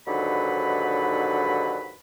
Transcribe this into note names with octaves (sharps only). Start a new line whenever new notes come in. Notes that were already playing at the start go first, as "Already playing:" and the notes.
D#2 G#2 D3 F#3 B4 B5